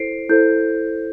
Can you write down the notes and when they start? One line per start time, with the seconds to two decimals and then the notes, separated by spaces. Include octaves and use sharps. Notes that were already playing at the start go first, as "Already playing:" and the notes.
Already playing: E4 A4 C5 C7 D7
0.29 E4 A4 C5 G6